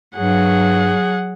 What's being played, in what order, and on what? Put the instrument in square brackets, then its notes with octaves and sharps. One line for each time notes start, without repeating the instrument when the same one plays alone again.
[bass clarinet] G2 [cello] F#3 [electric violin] G#4 F#5